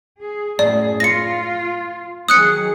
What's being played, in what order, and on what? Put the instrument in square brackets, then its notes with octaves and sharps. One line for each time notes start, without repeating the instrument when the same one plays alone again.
[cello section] G#4
[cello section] F#2 A2 G#4 [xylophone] D5
[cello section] F4 [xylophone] A#6 C#7
[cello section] D#3 F#3 G#4 [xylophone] D#6 F#6 C#7